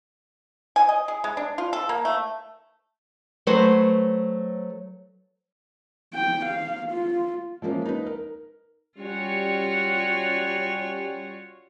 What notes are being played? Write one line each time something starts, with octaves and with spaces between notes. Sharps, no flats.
G#5
D#5
G#4
G#3
D4
F4
A4
A#3
A3
F#3 A3 B4 C5
G5
F5
F4
F3 G#3 A#3 C#4 E4
D#4 B4
A#4
G3 C#4 F4 F#4 C#5